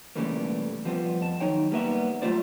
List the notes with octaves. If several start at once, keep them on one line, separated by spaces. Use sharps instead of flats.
B1 C#3 E3 G3 A3 A#3
F3 G3 B3 C4
F2 A5
D#2 F#3 D#4 C#5 G5
G3 A#3 B3 E5
F#3 G3 A3 F4 C5 D5